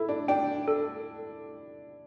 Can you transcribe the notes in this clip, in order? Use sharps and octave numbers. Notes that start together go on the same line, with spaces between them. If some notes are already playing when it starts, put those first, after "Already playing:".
Already playing: E4 A4
D4
D4 G5
A4